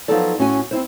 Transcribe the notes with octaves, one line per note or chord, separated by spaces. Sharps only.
F3 F#3 B3 D#4 A4 D5
A2 C#4 F#4 G#5
C4 E4 C5